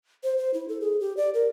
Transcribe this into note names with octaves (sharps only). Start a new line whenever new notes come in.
C5
C5
E4
A4
G#4
G4
D5
A#4